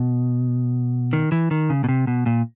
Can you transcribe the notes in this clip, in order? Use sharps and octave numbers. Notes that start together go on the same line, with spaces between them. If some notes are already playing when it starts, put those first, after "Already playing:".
Already playing: B2
D#3
E3
D#3
C#3
B2
C3
B2
A#2